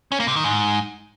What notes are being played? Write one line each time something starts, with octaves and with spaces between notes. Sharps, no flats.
C#4
A#3
C3
D#3
G#2